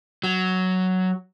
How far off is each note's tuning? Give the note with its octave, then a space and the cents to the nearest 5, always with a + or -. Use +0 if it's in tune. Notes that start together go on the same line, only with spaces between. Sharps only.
F#3 +5